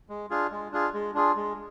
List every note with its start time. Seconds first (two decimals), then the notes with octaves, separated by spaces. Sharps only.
0.09 G#3
0.30 D4 F4 G#4
0.51 G#3
0.72 D4 F4 G#4
0.94 G#3
1.14 D4 F4 G#4
1.36 G#3